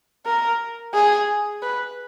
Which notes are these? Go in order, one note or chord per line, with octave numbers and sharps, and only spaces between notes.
A#4
G#4
B4